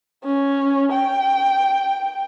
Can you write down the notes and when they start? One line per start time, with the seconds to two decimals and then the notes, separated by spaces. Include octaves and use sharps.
0.24 C#4
0.92 G5